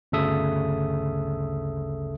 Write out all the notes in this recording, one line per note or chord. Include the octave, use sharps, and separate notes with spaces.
G1 D2 C#3 A4 E5 D#6